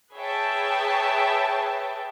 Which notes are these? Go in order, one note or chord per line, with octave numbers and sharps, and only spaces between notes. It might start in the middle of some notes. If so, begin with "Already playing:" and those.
G#4 B4 C#5 E5 G5 A5